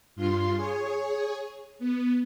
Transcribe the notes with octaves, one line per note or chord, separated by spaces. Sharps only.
G2 F4 C6
G#4 C#5
B3